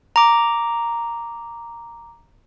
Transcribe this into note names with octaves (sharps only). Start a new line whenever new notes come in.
A#5 D6